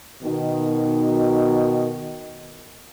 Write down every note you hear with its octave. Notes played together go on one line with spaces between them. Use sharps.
B2 D#3